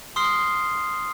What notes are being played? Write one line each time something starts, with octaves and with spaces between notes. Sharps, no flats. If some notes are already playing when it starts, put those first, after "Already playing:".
C6 D#6 F6 C7 G7